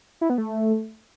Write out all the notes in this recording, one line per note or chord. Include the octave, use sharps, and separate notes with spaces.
E4
B3
A3